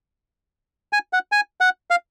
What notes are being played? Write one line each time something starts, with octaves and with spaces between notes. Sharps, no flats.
G#5
F#5
G#5
F#5
F5